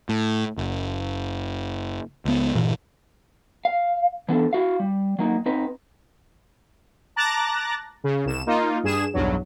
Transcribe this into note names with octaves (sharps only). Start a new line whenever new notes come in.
A2
F#1
C#2 B3
G1 A#2 E3
F5
E3 B3 D4 A4
E4 F#4 F5
G3
F#3 A#3 D#4
C4 D#4 B4
A5 A#5 D6 F#6 A6 A#6
C#3
C2 E7
A#3 D#4 F4
G2 G#4 E7
B1 E2 G2 F#3